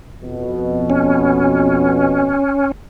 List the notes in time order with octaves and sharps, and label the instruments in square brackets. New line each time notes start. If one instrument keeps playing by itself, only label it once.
[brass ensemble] F2 B2
[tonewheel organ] C#4